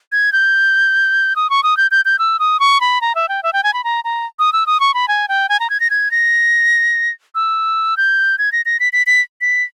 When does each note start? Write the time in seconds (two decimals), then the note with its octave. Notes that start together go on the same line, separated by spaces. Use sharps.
0.12 G#6
0.33 G6
1.36 D#6
1.50 C#6
1.63 D#6
1.77 G6
1.91 G6
2.05 G6
2.19 E6
2.39 D#6
2.60 C#6
2.81 B5
3.01 A#5
3.15 E5
3.29 G5
3.43 E5
3.53 G5
3.64 G#5
3.74 B5
3.84 A#5
4.04 A#5
4.39 D#6
4.53 E6
4.67 D#6
4.80 C#6
4.94 B5
5.08 G#5
5.28 G5
5.49 G#5
5.60 A#5
5.70 G#6
5.80 A#6
5.90 G#6
6.11 A#6
7.35 E6
7.97 G6
8.38 G#6
8.52 A#6
8.66 A#6
8.80 B6
8.93 B6
9.07 B6
9.41 B6